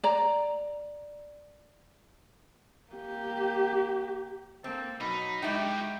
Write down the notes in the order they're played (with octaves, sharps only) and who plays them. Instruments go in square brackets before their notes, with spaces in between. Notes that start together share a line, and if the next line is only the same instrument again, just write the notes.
[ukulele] D5 A#5
[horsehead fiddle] A#3 G4
[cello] A#3 [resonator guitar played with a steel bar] C4 [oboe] A4
[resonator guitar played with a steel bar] B2 [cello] F#3 [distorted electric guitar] D#4 [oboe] B5
[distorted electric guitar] G3 F#4 [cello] G#3 G4 [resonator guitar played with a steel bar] D#4 E4 [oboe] G5